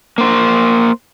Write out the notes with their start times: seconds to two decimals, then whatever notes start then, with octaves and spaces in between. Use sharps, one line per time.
0.18 A#3 C5